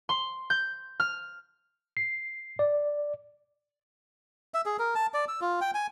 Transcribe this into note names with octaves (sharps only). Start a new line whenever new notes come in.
C6
G6
F6
C7
D5
E5
G#4
A#4
A5
D5
E6
F4
G5
G#5